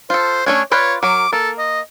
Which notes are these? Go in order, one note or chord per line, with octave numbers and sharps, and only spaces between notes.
F4 A4 C5
A3 C#4 D4 C#5
F4 B4 C#5 D5
F#3 A#4 D6
A#3 A4
D#5